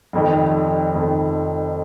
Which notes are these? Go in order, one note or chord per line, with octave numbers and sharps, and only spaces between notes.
F1 F2 D#3
F1 F2 D#3